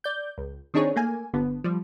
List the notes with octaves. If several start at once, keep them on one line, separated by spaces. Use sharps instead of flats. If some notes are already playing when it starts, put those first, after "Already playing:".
D5 G6
C#2
D#3 C4 D4 D#4 G#4 C#5
A3 A#3 G#5
G1 D3 B3
F3 G3